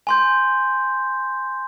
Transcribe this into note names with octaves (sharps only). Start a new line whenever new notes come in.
G#5 C6 G6